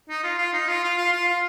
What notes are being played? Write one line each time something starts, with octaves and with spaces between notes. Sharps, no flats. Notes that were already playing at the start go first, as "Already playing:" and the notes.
D#4
F4
F4
D#4
F4
F4
F4
F4
F4